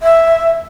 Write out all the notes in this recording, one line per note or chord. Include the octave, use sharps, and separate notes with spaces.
E5